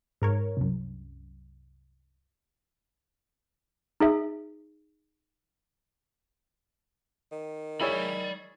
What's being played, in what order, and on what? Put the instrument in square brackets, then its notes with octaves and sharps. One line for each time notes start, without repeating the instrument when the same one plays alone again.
[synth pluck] G#2 A#4 C#5
C2 F#2
[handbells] D#4 G#4 E5
[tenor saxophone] D#3
[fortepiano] E4 G#4 C#5 [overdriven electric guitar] D5 B5